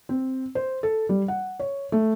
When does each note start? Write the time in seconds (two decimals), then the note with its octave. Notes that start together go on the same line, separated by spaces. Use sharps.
0.09 C4
0.55 C5
0.83 A4
1.09 G3
1.28 F#5
1.60 C#5
1.92 A3